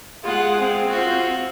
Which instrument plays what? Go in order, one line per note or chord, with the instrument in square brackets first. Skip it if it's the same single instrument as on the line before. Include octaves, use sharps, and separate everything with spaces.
[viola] G#3 [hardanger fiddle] F4 F#5
[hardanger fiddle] C4
[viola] C4 F4 [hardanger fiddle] F#4